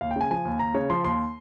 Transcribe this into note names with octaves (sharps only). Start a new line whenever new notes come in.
D#2 F5
G5
C#3 G#5
F3 G#5
D#2
D#2 A#5
C#3 C#5
F3 C6
D#2 C6